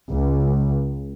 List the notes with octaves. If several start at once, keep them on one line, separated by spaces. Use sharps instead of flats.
C#2